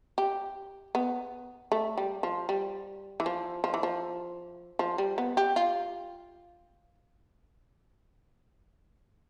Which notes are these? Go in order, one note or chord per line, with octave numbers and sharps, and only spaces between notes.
G4
B3
A3
G3
F3
G3
E3
F3
F3
E3
F3
F3
G3
B3
G4
F4